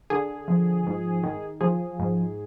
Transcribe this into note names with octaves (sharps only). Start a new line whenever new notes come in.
D3 G#4
F3
G#2
D#3
F3 G#4
G#2